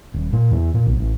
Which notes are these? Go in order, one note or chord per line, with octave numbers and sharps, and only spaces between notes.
D#1
A#2
E2
A#2
B1
A1